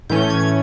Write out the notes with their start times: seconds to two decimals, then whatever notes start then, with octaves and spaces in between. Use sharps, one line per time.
0.09 A2 E3 A3 C#4 G6
0.30 G#6